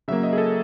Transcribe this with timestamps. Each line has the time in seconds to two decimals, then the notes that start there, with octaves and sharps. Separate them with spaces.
0.08 C#3 F#3 A#3 E5
0.23 D#5
0.33 G#4
0.38 A4